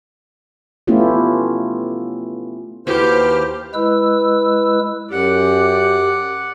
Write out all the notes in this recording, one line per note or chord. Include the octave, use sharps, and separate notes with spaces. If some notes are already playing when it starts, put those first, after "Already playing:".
A3 B3 C#4 E4 F4 G4
D#2 E4 F#4 G4 A4 B4 C5 F6
G#3 E4 B4 E6
F#2 G4 D5 F#5